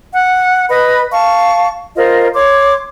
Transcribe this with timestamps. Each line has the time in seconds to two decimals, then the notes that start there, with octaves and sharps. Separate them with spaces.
0.12 F#5
0.69 B4 D#5 B5
1.12 F5 A5 C#6
1.97 F4 A#4 C5 D#5
2.34 C#5 C6 D6